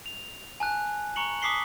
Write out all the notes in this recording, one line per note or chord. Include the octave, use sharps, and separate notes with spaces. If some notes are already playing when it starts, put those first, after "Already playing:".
F7
G#5 A5 F#6
A#5 C#6 C#7 F#7
A5 D6 D#6 B6 C7 G7